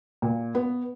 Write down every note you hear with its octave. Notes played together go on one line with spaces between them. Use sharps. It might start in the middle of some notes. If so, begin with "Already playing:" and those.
A#2
B3